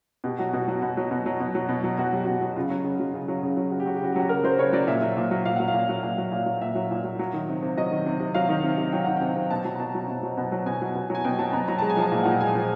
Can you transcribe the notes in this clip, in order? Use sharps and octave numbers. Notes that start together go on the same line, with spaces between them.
B2 G4
F#3 F#4
B2 F#4
F#3 F#4
B2
F#3
B2
F#3
B2
F#3
B2
F#3
B2 F#4
F#3 G4
B2 F#4
F#3
C#3 F4
F#3
C#3
F#3
C#3
F#3
C#3
F#3
C#3 F#4
G4
F#3 F#4
G4
C#3 F#4
G4
F#3 F#4
C#3 A#4
F#3 C5
C#3 C#5
F#3 D5
A#2 E5
F#3
A#2
F#3
A#2 F5
F#3 F#5
F5
A#2
F#3
A#2
F#3
A#2
F#3
A#2 E5
F#3
A#2
F#3
F#3
D#3
C3
C3
F#3 D#5
D#3
C3
C3
F#3 F5
D#3
C3
C3
F#3 G5
D#3 F#5
C3 G5
C3
B2 A5
F#3
A#5
B2 A5
F#3
B2
F#3
B2
F#3
B2 G#5
F#3
B2
F#3 G#5
B2 G5
F#3 A5
B2 A#5
F#3 A#5
G#3 A5
G#5
F3 A5
A#2
A#2 F#5
G5
G#3 G#5
F3